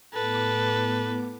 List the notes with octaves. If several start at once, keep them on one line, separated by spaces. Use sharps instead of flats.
A2 B3 A4 B4 D6